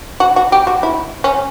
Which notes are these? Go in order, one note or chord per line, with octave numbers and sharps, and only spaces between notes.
F#4
F#4
G4
F#4
E4
C#4